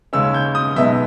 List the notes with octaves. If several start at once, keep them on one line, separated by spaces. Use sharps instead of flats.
D#2 C#3 G#3 C#4 E6
G6
D#6
B1 B2 G#3 B3 D#4 E5